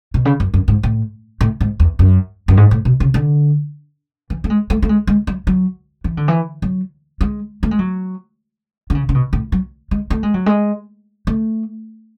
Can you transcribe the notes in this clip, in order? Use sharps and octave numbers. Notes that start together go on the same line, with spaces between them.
B2
C#3
F#2
F#2
G#2
A2
A2
G#2
E2
F#2
F#2
G#2
A2
B2
C#3
D3
E3
A3
G#3
A3
A3
G#3
G#3
F#3
F#3
E3
D3
E3
F#3
G#3
A3
G#3
F#3
D3
C#3
C#3
B2
A2
F#3
G#3
A3
G#3
F#3
G#3
A3